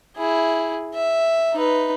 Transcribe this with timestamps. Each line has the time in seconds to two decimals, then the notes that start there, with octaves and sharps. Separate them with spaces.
0.17 E4 G#4
0.94 E5
1.54 D#4 B4